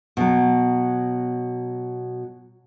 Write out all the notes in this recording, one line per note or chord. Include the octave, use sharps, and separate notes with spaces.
B2 F#3